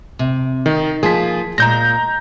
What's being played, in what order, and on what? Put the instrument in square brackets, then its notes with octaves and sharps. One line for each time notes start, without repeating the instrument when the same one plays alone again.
[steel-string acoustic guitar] C3
[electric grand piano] D#3 [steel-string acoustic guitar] D#4
[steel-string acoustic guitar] F3 A#3 F4 [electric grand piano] G#4 B6
[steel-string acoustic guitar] A#2 G#3 [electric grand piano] A#5 G6 A#6